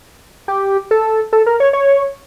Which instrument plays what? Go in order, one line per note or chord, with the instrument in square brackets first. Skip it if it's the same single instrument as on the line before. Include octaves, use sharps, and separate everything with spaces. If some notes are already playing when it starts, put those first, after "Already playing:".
[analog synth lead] G4
A4
A4
A#4
C#5
C#5